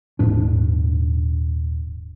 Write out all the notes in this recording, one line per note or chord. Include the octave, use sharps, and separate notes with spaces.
D#1 G#2 D4